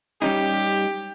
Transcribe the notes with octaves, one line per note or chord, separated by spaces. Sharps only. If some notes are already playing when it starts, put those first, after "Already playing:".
G3 C#4 D#4 G4